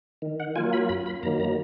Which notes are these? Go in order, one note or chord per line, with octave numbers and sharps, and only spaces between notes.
D#3
F#5
F#3 A#3 F4 G#5
B5
F#2 B5
B5
D#3 F#3 A#3 A#5
A#5